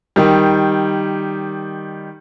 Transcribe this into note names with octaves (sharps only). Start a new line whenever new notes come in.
D#3 G3